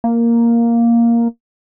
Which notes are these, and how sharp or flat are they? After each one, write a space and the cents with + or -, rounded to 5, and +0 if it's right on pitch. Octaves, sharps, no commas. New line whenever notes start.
A#3 +0